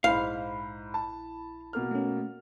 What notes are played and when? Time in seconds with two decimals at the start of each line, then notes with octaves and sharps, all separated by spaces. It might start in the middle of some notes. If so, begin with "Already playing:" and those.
0.04 A#1 G#2 E4 C5 F5 B5
0.94 A5
1.73 B2 A#3 F6
1.91 A3 C#4